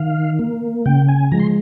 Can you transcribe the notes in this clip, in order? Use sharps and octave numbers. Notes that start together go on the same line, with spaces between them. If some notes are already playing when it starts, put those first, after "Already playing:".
Already playing: D#3 F5
A#3
C#3 G5
G#5
F3 G#3 A#5
C6